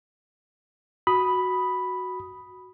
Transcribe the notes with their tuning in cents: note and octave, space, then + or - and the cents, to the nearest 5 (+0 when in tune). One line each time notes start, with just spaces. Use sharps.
F#4 +0 B5 +0 D#6 +0